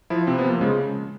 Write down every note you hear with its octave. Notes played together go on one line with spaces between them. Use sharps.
F3 E4
C3 C4
B3
F3
A#3
C#3 G#3